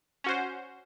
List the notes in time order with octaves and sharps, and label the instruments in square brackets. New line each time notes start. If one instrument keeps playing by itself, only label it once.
[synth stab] C#4 F#4 C5